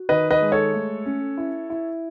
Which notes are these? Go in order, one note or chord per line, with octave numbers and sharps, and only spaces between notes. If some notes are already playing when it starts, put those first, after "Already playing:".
Already playing: F#4
D#3 B4 D#5
B4 D#5
G#3
A4 C#5
A3
C#4
E4
E4